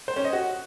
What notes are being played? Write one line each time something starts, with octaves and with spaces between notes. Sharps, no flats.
C5
C#4
D#5
F#4